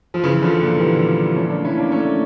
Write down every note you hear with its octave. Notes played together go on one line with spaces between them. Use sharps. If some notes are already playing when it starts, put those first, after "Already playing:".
F3
C#3 E3
D3 F3
A#2 D3
E3 G3
A3 C#4
A#3 D4
C#4 E4
A#3 D4
A3 C#4